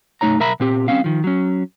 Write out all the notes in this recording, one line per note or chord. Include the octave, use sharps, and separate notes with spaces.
B1 F#2 A3 D#4 C#5 A#5
B1 A#4 E5 A#5 B5
A#2 C4 G4
G3 C4 C#4 F5
D#3 F3
F#3 C#4